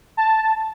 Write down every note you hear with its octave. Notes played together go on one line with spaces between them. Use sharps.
A5